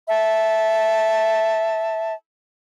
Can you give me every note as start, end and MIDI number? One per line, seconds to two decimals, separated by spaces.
0.08 2.12 76
0.08 2.12 81